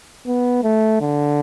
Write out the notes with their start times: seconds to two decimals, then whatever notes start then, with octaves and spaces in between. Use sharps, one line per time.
0.27 B3
0.63 A3
1.01 D3